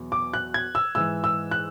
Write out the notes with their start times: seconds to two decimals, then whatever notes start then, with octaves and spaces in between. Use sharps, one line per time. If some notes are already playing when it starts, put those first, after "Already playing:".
Already playing: E2 B2 F#3
0.12 D6
0.33 F#6
0.54 G#6
0.75 E6
0.95 G#2 E3 E6
1.24 E6
1.51 F#6